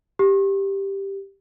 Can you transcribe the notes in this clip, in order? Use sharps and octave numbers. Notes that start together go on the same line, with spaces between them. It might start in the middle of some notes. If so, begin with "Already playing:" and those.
G4